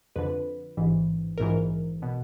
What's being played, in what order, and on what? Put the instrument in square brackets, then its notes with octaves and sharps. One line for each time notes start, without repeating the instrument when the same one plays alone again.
[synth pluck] F2 D3 B4
A1 G#2 E3
A#1 G#2 E3 A#4
B2